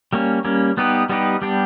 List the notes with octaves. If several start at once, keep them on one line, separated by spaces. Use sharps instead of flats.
G3 A#3 C#4
G3 A#3 C#4
G3 B3 D#4 G4 B4
G3 B3 D#4 G4 B4
G3 B3 D4 G4